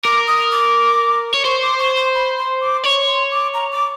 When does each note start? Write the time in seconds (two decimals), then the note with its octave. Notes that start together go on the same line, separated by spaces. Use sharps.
0.04 A#4 D6
0.27 D#6
0.51 D6
1.34 C#5
1.45 C5 C#6
1.62 D6
1.79 C#6
1.97 C6
2.15 B5
2.38 C6
2.61 D6
2.84 C#5 C#6
3.07 C6
3.31 D6
3.54 A#5
3.72 D6